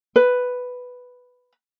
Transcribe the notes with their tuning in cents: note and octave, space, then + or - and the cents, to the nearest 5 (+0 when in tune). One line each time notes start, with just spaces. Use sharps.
B4 +5